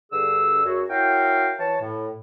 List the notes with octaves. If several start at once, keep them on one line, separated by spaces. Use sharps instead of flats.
G2 D3 G#4 E6
F#2 F#4 G#4
E4 F#4 A#4 C#5 F5 G5
E3 C#5 A5
A2